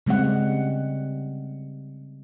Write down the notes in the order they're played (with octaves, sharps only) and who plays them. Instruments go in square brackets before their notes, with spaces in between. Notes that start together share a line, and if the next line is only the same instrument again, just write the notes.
[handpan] C#3 G3 G#3 C4 F#5